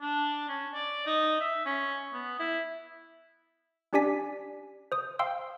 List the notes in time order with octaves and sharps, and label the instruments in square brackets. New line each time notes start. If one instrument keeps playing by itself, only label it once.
[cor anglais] D4
C#4
D5
D#4
E5
C#4
B3
E4
[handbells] C#4 D4 G4 D5 G#5 B6
C5 D#6
F5 G5 C6 E6